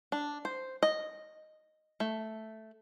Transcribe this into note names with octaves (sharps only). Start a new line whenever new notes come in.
D4
C5
D#5
A3